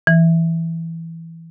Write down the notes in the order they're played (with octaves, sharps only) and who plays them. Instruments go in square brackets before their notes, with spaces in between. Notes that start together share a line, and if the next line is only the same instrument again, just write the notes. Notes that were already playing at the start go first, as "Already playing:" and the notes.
[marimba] E3